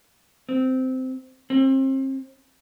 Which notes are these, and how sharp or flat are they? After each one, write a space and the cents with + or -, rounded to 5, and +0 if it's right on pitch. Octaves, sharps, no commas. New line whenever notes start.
C4 -15
C4 +35